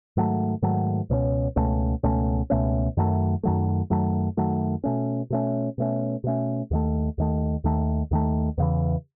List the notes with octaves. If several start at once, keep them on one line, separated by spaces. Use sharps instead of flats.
G#2 D#3 F#3 A3
G#2 D#3 F#3 A3
C#2 B2 A3 C#4
C#2 B2 A3 C#4
C#2 B2 A3 C#4
C#2 B2 A3 C#4
F#2 D#3 F#3 A3
F#2 D#3 F#3 A3
F#2 D#3 F#3 A3
F#2 D#3 F#3 A3
B2 A3 C#4
B2 A3 C#4
B2 A3 C#4
B2 A3 C#4
D#2 D#3 A3
D#2 D#3 A3
D#2 D#3 A3
D#2 D#3 A3
E2 C#3 E3